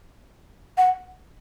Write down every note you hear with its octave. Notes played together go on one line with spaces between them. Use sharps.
F#5